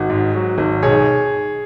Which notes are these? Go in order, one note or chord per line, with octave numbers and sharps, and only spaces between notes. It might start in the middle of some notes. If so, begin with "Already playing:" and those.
Already playing: G#1 F#4
G#2
F#3
G#1
B1 G#4 C#5